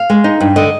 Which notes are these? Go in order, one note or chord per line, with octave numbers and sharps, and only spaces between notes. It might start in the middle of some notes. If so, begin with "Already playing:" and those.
Already playing: F5
G#3
D#4
G2
D3 D#5